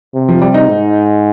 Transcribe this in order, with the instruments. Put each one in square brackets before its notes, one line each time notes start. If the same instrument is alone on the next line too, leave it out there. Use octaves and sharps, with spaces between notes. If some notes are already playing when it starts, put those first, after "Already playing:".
[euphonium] C3
[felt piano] F3
G3
D#4
[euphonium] G#2